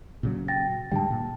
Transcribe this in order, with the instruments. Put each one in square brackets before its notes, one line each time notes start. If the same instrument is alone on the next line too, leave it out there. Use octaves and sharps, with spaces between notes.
[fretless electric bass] A#2 C#3 F#3
[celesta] G5 A6 A#6
[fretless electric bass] G#2 D3 G3 [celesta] G5 A5
[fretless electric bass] A#2